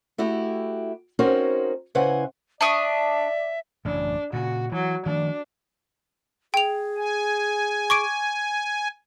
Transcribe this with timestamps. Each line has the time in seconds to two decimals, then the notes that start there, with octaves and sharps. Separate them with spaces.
0.18 A3 E4 F#4 G4
1.19 C4 C#4 D#4 F#4 A#4 C5
1.95 C#3 E4 B4 C5 F#5 G#5
2.61 D4 D5 E5 C#6 D#6
3.85 A1 F#2 C#3 D4
4.33 A#2 C#3 F#4
4.72 E3 F#3
5.06 D#3 F3 A3 D4
6.54 G#4 G5 F7
6.97 G#5
7.90 C#6 D6 D7